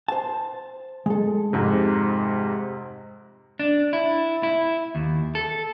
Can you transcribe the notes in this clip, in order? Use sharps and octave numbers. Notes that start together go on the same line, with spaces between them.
C5 A5
G#3 A4
F2 G#2 C3
D4
E4
E4
D#2
A4